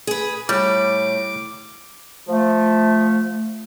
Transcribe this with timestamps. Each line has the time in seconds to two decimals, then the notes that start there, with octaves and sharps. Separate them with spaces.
0.07 G#4 B4
0.49 A2 G3 D6
2.28 F3 A3